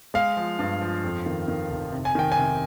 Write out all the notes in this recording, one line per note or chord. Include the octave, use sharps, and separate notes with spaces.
G#3 F5
F3
G2
F3
F2
D#3
D#3
F1
C3
G#5
D#3 G5
C3 G#5